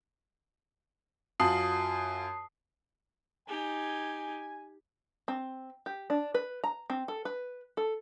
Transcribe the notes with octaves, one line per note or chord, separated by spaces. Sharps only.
F#2 F4 F#4 A5 D#6 C7
D#4 G4 G#5
C4
G4
D4
B4
A#5
C4
A4
B4
A4